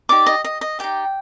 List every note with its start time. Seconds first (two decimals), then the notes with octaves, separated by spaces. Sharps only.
0.09 D#4 G4 D5 D6
0.26 D#5
0.44 D#5
0.61 D#5
0.79 D#4 G4 D5 G5